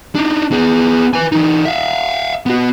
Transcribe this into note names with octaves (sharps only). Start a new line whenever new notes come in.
D4 D#4
B3 G#4
B4 G#5
E3 D#4
E5 F5
B3 F#4